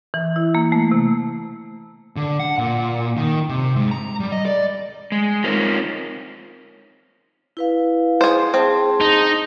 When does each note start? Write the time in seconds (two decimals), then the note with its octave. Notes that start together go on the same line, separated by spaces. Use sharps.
0.14 E3
0.36 E4
0.55 A#3
0.72 A3
0.92 C3
2.17 D3
2.40 F#5
2.58 A#2
3.17 D#3
3.49 C3
3.76 G#2
3.91 A#5
4.20 G3
4.32 D#5
4.46 D5
5.12 G#3
5.44 C4 D#4 F4 A#4 C5 C#5
7.57 E4 B4 F5
8.21 G#4 C5
8.54 C4 G#4 A5 C6
9.01 D#4